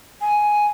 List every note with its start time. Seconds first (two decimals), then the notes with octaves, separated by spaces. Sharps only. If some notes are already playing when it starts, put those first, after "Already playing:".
0.22 G#5